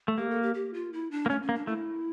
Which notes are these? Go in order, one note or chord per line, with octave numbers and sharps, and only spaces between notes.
A3
A#3 G4
A4
G4
G4
F4
E4
D4
A#3
A3 C#4
C#4
A#3
D4
A3 E4